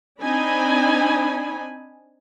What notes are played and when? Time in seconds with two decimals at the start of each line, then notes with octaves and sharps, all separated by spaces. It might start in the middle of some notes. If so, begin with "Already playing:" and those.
0.21 C4 D4 D#4 G#5 B5